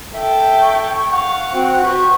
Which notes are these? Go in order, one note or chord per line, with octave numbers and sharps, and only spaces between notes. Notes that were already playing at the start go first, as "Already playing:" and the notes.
A4 E5 G5
C#6
F5 F#5
C4 F#4
F#4 B4 C5 C#6